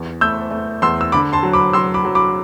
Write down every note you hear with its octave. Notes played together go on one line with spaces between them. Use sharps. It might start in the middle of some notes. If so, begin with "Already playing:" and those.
Already playing: E2
A3 E6 G6
A3
E2 C6 E6
E6
D3 B5 D6
A5 C6
F#3
B5 D6
F#3 C6 E6
B5 D6
F#3
B5 D6